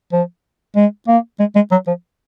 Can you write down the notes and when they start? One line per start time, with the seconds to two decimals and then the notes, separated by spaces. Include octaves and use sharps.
0.12 F3
0.76 G#3
1.08 A#3
1.39 G#3
1.56 G#3
1.71 F#3
1.87 F3